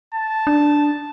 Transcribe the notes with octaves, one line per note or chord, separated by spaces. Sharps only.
A5
D4